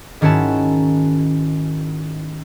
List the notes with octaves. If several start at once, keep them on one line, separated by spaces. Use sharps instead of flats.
G#2 D#3 C#4 E4 F#4 A5